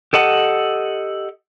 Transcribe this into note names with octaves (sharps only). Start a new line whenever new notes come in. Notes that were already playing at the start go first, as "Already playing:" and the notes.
G4 A4 D#5 F#5